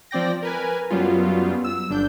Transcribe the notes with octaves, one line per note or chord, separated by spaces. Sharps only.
F3 C4 D5 G5 A#6
A#4 B4 G#5
F#2 F#3 G3 B3 F4
E6
G1 D4 G6